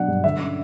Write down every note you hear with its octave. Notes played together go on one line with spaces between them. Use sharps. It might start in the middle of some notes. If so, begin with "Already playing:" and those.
Already playing: B2 F#3 D4 F#5
G2
D3 E5
C#4